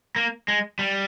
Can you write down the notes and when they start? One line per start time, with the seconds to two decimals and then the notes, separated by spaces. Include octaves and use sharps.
0.16 A#3
0.48 G#3
0.79 G3